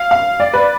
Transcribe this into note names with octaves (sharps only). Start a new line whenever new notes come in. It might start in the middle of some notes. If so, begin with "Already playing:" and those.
Already playing: F5
F5
D5
B4